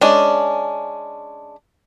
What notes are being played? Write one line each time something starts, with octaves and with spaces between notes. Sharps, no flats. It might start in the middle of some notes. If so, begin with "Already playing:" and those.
G#3 C#4 D4